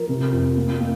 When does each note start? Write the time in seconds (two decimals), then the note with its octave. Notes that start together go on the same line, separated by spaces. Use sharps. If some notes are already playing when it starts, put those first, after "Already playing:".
Already playing: F3 A#4
0.09 C3
0.32 F2
0.57 A#3
0.81 A#3